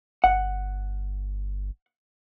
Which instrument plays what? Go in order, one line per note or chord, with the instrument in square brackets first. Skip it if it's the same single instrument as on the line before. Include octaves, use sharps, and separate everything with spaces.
[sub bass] G1 [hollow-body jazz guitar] F#5